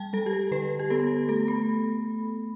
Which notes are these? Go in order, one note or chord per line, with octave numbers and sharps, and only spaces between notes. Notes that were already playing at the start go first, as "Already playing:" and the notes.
Already playing: G3 G5 A5
G3 A4
G4
A4
D3 B4
G4
B3 A4
A3 A4
B5